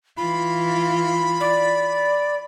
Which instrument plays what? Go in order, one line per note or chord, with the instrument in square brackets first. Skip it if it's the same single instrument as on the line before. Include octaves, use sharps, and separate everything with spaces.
[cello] E3 F4 [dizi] B5
[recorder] D5